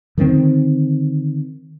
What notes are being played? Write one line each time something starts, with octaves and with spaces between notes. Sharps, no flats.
D3 D#3 G#3 C4